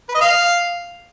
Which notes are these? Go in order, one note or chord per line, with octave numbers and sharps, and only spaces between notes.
B4
D#5
F5